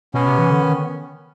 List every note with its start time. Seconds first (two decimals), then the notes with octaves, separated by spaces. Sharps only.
0.14 B2 B3 C#4
0.26 C3
0.38 E3
0.51 D3
0.63 D#3